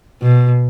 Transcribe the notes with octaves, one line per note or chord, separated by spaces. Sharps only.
B2